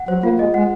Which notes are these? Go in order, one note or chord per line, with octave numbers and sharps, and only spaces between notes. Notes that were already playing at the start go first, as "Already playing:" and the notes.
Already playing: F#5
F#3 C5
A#3 F4
G#3 D#5
G#3 F#5